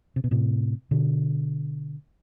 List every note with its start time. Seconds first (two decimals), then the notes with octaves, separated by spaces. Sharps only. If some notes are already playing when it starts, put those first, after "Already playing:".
0.16 C3
0.24 B2
0.31 A2 C3
0.91 B2 D3